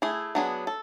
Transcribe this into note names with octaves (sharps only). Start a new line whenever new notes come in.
A3 E4 G#4
F#3 B3 D4 G#4
A4